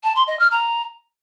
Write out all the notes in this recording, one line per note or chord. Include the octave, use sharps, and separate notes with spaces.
A5
C6
D#5
F6
A#5